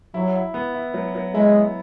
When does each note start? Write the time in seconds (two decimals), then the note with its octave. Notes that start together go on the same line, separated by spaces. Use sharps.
0.14 F#3 E4
0.35 E4
0.54 B3
0.74 E4
0.94 F#3
1.15 F#3
1.34 G#3 E4
1.54 E4